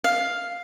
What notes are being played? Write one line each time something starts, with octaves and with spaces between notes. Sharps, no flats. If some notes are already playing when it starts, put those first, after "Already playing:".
F5